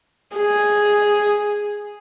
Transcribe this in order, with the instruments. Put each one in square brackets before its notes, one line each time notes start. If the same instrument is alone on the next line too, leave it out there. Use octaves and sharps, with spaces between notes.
[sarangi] G#4